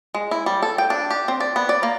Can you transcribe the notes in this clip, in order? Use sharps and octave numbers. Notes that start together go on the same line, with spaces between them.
G#3
E4
G3
A4
G5
D4
G4
C4
D5
B3
D5
A#3